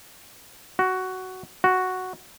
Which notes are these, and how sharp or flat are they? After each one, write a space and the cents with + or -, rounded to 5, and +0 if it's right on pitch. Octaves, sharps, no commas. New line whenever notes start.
F#4 +10
F#4 +0